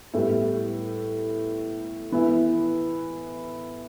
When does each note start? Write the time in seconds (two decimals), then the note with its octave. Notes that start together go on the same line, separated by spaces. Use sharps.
0.14 A2 G3 B3 E4
2.12 E3 B3 E4